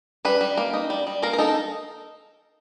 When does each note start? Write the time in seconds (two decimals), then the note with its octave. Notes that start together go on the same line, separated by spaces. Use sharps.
0.25 G3 B4
0.41 G3
0.57 A#3
0.73 D#4
0.90 G3
1.07 G3
1.23 A#3 A#4
1.33 A#4
1.39 D#4 A4